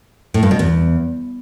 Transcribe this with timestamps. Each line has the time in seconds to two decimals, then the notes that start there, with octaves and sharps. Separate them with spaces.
0.34 A2
0.43 G2
0.51 B2
0.59 E2